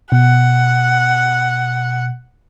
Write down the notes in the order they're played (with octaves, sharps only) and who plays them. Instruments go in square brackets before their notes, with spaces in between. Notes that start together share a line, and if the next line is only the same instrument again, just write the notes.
[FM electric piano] B2 [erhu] F#5